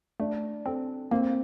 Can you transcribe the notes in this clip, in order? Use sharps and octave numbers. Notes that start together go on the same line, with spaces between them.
A3 D4
C4 A4
A#3 C4